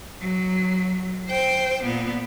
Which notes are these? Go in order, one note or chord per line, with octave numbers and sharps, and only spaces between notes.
F#3
C5 G5
A#2 B3